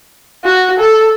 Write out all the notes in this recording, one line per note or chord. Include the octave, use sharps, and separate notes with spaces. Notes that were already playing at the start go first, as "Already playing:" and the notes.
F#4
A4